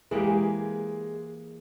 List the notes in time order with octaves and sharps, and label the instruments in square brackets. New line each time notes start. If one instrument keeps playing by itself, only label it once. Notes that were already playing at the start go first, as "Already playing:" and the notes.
[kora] E3 A#3 G4 [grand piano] G#3 G#4